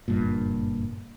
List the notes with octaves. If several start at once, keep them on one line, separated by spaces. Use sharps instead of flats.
F#1 G2 A#2